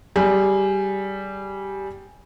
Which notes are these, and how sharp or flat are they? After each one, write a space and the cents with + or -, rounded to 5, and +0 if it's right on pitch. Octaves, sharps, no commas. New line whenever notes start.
G3 -10 G#4 +0